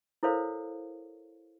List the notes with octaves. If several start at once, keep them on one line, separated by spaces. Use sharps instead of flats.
E4 A4 A#4 C5 C#5 F5